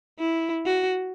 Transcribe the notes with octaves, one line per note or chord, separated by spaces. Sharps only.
E4
F#4